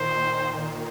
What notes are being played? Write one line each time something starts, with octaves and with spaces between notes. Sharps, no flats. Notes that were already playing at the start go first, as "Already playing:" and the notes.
Already playing: A#2 D#3 C5